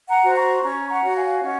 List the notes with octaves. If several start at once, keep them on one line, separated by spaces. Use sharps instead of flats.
F#5 A#5
F#4 C5
A#5 C#6
C#4 A#5 C#6
F#5 A#5
F#4 C#5
F5 G#5
C#4 D#5 F#5